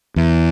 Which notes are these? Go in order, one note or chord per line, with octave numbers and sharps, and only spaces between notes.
E2